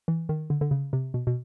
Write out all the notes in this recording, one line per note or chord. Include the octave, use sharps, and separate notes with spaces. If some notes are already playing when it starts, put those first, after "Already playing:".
E3
D#3
D3
D3
C#3
C3
B2
B2